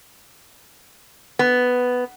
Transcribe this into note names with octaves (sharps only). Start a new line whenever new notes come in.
B3